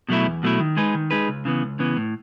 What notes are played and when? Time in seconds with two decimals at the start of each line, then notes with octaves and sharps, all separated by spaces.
0.09 B2 F#3 A3 E4
0.26 E2
0.43 B2 F#3 A3 E4
0.60 D#3
0.77 G#3 D#4 G#4 B4
0.95 D#3
1.11 G#3 D#4 G#4 B4
1.28 C#2
1.45 C#3 E3 B3
1.63 C#2
1.79 C#3 E3 B3
1.96 A2